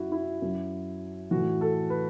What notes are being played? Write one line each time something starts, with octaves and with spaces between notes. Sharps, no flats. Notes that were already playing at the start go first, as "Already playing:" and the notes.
Already playing: F#2 F#3 E4 F#4
E4
F#2 F#3
A2 E3 F#4
A4
B4